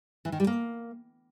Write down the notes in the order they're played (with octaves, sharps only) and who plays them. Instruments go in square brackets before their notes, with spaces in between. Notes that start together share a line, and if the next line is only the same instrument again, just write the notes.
[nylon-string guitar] E3
D#3
G3
A#3